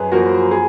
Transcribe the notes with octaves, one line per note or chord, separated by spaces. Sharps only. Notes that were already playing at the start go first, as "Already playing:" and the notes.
Already playing: F#2 G#4 B4
F3 A#3 F#4 A#4
G#4